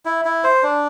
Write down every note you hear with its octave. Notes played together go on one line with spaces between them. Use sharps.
E4
E4
C5
D4